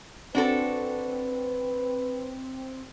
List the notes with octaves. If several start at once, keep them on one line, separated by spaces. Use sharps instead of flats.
C4 D4 F#4 A4 B4